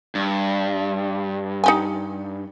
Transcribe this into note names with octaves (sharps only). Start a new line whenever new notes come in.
G2
D#4 G4 G#5